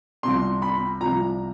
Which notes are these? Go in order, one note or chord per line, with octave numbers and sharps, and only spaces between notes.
C2 C3 F3 C6
B5
C2 C3 F3 A#5